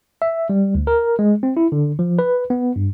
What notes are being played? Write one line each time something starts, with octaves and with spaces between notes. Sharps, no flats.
E5
G3
D2
A#4
G#3
C4
E4
D3
F3
B4
B3
G2